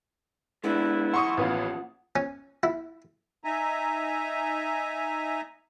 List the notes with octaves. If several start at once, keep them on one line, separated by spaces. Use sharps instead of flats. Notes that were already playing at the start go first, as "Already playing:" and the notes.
G#3 B3 D4 E4
D#2 F3 F#5 C6 C#6 D#6
A1 B3 F4
C#4
E4
D#4 E5 G#5 A#5